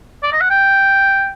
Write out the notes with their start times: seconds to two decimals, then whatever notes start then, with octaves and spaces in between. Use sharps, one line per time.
0.23 D5
0.32 D#5
0.41 F#5
0.50 G5